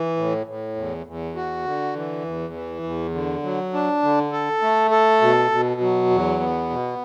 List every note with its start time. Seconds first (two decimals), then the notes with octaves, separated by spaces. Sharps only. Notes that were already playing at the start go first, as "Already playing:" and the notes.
Already playing: E3
0.17 A2
0.47 A2
0.76 E2
1.06 E2
1.36 F#4
1.65 D3
1.95 E3
2.25 E2
2.54 E3
2.83 E2
3.14 D3
3.43 F#3
3.73 D4
4.03 D3
4.32 A4
4.62 A3
4.91 A4
5.22 B2
5.51 B2
5.81 F#3
6.10 E2
6.40 B3
6.70 B2